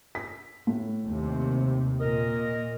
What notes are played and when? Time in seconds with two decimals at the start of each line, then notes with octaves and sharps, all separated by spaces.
0.15 B6
0.67 A2
1.06 D#2 C3
2.00 A#2 A#4 D#5